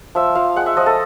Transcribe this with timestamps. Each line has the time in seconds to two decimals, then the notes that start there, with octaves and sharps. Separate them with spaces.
0.15 F3 E5
0.35 F3 F5
0.56 G#3 F#5
0.66 E5
0.77 F3 D#5
0.86 A4